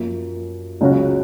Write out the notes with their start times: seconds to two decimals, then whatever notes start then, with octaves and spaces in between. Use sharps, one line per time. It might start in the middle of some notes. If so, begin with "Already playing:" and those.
Already playing: F#2 F3 A#3
0.81 C#2 C#3 F#3 C#4 F#4